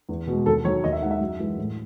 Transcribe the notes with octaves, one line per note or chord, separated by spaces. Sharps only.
E2
B2 G#3
D#2 A4
D#3 F#3 C#5
D#2 D#5
E5
D#3 G#3 F#5
E5
F#2
E3 G#3
A2